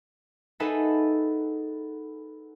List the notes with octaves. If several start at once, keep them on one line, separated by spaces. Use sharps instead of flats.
D#4 G#4 A4 B4 E5 F#5